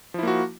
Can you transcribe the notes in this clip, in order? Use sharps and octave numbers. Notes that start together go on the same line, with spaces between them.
F3 A#3 E4 F#4